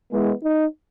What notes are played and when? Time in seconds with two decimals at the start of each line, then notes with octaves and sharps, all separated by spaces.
0.12 E3 G#3 B3
0.43 D#4